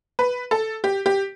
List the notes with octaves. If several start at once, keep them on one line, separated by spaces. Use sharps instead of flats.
B4
A4
G4
G4